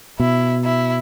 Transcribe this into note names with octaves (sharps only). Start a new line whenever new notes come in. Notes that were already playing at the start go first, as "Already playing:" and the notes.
B2 E4
E4